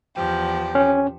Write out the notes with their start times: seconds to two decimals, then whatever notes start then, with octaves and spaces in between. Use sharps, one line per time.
0.15 E2 F3 G4
0.75 C#4